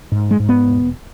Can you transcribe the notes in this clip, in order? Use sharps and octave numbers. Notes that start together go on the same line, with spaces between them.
G#2
G#3
G#2
B3
E1